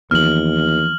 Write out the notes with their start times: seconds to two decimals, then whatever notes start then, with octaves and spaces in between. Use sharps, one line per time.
0.11 D#2 E3 F3 B3 F6 F#7